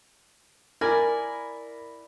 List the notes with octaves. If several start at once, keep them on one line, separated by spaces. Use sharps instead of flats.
E4 A#4 D5 G#5